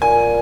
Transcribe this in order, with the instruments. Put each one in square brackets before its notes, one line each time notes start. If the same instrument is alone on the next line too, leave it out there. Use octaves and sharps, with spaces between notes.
[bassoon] A#2 [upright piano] G#5